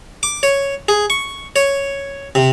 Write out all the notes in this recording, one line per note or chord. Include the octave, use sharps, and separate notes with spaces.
D6
C#5
G#4
C#6
C#5
C3